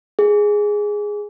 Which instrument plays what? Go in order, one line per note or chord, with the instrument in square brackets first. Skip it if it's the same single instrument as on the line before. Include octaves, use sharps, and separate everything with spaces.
[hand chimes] G#4